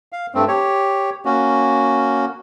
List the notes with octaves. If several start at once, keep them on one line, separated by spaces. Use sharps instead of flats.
F5
G2 A3 C4
G4 C#5
A#3 C#4 F#4